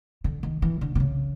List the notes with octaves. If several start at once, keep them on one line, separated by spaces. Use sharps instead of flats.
D3
D#3
E3
D3
C3
C#3